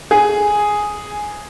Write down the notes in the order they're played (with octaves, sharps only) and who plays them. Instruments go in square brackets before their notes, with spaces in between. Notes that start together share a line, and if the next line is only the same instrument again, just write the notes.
[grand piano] G#4